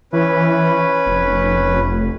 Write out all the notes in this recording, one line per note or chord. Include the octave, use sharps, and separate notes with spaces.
E3 C#4 B4
F1